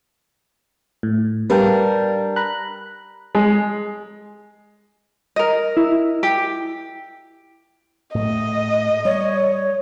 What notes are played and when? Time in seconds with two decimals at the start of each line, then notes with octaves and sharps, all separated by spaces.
1.03 A2
1.50 G3 D4 A#4 B4 F5 G5
2.36 A#5 B5 F#6
3.35 G#3
5.36 A#4 D#5
5.77 E4
6.23 G4
8.15 A2 A3 D#5
9.05 G3 C#5